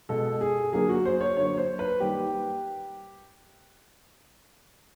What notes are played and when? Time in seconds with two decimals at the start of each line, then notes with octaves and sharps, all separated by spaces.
0.09 B2 G#3 A4
0.41 G#4
0.72 D3 F#3 A#3 G#4
0.89 F#4
1.05 C5
1.21 C#5
1.36 D3 F#3 A#3 C#5
1.58 C5
1.79 B4
2.00 D#3 G3 A#3 G4